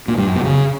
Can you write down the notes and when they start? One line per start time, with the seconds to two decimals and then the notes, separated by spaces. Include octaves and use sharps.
0.08 A#2
0.17 G2
0.27 F#2
0.36 B2
0.45 C#3